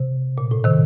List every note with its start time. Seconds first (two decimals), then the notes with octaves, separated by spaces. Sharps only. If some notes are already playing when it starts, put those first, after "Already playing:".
Already playing: C3
0.38 A#2
0.51 A2
0.64 C3 D#3